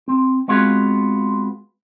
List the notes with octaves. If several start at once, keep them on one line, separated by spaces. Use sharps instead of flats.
C4
G#3 B3 C4 F4 F#4 G#4